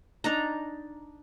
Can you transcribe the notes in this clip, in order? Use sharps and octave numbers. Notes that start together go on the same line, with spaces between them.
D4 D#4 A#5